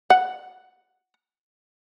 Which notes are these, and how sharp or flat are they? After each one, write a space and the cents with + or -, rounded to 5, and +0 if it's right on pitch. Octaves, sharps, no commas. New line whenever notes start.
F#5 +0